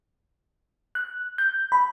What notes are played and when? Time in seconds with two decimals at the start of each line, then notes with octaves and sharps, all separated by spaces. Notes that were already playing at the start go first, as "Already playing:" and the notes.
0.95 F#6
1.38 G6
1.72 B5